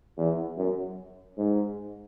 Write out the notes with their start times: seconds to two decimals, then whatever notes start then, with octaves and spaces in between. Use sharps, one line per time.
0.18 E2
0.57 F#2
1.37 G#2